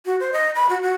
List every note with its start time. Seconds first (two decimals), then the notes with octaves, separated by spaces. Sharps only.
0.06 F#4
0.20 C5
0.33 D#5
0.55 B5
0.69 F#4
0.82 F#4